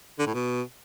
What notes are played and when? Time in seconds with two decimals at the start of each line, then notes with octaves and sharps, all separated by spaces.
0.19 D3
0.26 A2
0.34 B2